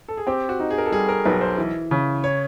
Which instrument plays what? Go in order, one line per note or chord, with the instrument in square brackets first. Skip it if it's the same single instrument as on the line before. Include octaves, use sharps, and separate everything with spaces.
[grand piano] A4
G#4
[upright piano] C4 [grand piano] G4
[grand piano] F#4
[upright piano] D#4
[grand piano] G#4
A#4
A4
[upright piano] G3 [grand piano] G#4
[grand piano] A#4
[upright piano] B1 [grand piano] B4
[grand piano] C5
[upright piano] E3
C#3
[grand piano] C#5